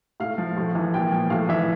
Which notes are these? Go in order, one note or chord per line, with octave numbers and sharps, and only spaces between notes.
A2 F5
F3
A2
E3
A#2 G5
F3
A2 F5
E3 E5